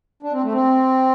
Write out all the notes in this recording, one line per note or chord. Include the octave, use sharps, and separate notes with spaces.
D4
C4
A3
C4